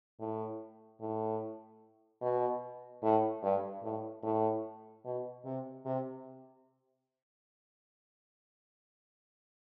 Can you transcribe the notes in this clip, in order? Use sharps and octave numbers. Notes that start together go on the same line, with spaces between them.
A2
A2
B2
A2
G2
A2
A2
B2
C3
C3